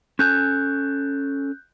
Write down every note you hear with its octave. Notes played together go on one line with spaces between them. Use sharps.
C#4 A4 G#5 F#6 G6